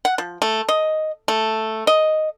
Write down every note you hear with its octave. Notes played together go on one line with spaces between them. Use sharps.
F#5
F3
A3
D#5
A3
D#5